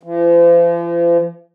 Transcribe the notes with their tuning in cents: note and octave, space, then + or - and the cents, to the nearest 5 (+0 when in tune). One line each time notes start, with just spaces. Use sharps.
F3 -40